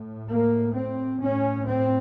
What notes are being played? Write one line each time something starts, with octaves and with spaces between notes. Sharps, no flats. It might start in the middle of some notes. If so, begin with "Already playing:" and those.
Already playing: A2
A#3
C4
A2 C#4
C4